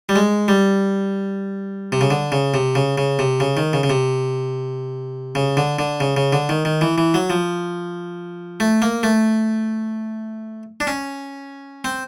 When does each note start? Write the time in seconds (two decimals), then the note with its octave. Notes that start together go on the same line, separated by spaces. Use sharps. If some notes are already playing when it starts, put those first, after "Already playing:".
0.09 G3
0.16 G#3
0.48 G3
1.92 C3
2.01 C#3
2.11 D3
2.32 C#3
2.54 C3
2.75 C#3
2.98 C#3
3.19 C3
3.40 C#3
3.57 D#3
3.73 C#3
3.83 C#3
3.90 C3
5.35 C#3
5.57 D3
5.79 D3
6.00 C#3
6.17 C#3
6.33 D3
6.49 D#3
6.65 D#3
6.81 E3
6.98 E3
7.14 F#3
7.30 F3
8.60 A3
8.82 A#3
9.03 A3
10.80 D4
10.87 C#4
11.85 C4